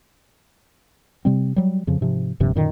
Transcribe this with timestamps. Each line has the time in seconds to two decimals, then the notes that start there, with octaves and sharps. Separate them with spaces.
1.25 C3 G3 C4
1.56 F#3 G3
1.87 F2 C#3 F3
2.01 G#2 C3 F3
2.40 D#1 G2 C3 F3
2.55 F#2 A#2 D3 D#3